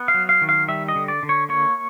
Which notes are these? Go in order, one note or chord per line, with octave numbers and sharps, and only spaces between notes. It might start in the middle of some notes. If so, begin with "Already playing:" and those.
Already playing: B3
F5
F#3
F5
D#3
F5
G3 E5
D#5
D3
D5
D3
C#5
A#3 C#5